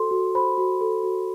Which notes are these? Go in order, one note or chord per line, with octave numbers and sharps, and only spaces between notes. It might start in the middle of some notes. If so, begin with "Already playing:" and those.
Already playing: F#4 A4 C5 C6
F#4
C5 B5
F#4
A4
F#4